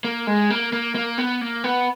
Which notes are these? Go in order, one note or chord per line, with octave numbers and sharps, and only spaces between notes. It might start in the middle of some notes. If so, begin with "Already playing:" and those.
A#3
G#3
A#3
A#3
A#3
B3
A#3
B3